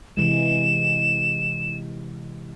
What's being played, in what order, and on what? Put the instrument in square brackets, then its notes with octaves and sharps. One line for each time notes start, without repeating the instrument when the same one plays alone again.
[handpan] C3 E3 G#3 [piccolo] E7